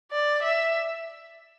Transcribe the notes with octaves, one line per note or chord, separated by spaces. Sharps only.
D5
E5